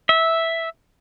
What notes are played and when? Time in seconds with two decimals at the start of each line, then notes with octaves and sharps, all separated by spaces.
0.09 E5